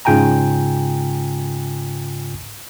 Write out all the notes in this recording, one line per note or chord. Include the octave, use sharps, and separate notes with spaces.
G#2 C#3 F4 G5 G#5 A#5